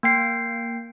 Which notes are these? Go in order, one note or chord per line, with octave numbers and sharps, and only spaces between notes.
A#3 G5 C7